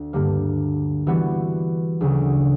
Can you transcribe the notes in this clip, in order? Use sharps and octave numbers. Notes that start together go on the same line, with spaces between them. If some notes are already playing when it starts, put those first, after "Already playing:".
Already playing: D2
G2 D3 G3 A#3
E3 G3 B3 F#4
D2 C#3 F#3